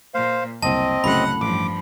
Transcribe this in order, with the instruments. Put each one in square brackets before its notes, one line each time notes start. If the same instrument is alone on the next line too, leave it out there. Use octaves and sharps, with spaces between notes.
[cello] A#2 [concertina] C5 F5
[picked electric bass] F#1 C2 [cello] A#3 [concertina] C4 D#5 [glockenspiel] A5
[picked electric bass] C2 F#2 C#3 [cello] A2 F#5 [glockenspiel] B5
[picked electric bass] A1 [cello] G2 F3 [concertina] D6